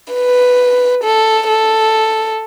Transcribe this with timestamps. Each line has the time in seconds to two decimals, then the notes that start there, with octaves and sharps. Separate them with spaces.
0.13 B4
1.04 A4
1.49 A4